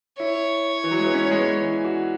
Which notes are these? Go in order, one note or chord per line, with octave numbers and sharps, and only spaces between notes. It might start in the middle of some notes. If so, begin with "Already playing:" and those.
E4 C#5
E3
F#3
G#3
B3
C#4
G#3
B3
E3
F#4